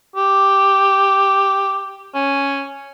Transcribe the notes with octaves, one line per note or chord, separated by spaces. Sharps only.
G4
C#4